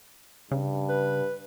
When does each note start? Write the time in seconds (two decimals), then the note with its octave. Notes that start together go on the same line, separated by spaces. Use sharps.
0.51 G2 C#3
0.89 B4